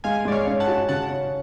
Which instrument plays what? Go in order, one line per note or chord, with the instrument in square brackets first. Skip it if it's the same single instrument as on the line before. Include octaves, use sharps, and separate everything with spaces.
[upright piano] G#3 [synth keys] F5 G#5
[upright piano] G#3 [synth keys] D5
[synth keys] C#5 F5
[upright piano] C#4
[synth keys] F#5 A5
[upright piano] F#4
[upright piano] C#3 [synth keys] F#5 A5
[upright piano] C#4